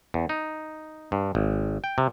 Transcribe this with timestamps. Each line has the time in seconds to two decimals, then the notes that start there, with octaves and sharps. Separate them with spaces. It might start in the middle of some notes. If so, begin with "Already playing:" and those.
0.14 E2
0.29 D#4
1.12 G2
1.35 G#1
1.84 G5
1.98 C3